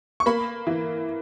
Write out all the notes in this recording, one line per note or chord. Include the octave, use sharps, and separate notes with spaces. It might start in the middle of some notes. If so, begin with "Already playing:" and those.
C#6
A#3 B5
E3